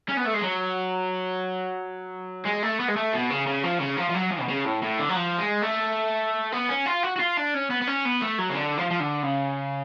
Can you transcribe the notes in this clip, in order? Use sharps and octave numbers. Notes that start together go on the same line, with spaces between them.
C#4
B3
A3
G#3
F#3
G#3
A3
B3
G#3
A3
B2
C#3
C#3
F3
C#3
F3
F3
F#3
F3
B2
C#3
A2
A2
D3
F#3
F3
G#3
A3
B3
C#4
F4
F#4
F#4
F4
D4
C#4
B3
B3
C#4
B3
A3
F#3
C#3
D3
F3
F3
D3
C#3